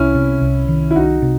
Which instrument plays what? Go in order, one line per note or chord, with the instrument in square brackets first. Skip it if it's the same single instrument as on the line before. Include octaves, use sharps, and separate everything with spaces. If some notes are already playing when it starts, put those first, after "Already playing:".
Already playing: [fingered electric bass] C2 [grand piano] C#4 E4
[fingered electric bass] C3
C2
D#3
[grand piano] E4
[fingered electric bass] C2 [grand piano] D#4 F#4
[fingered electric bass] C3